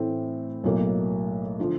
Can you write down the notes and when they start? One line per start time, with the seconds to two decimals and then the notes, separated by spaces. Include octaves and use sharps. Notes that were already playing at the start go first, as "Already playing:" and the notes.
Already playing: A2 E3 A3 C4
0.64 B1 A2 F#3 A#3
1.60 D3 F3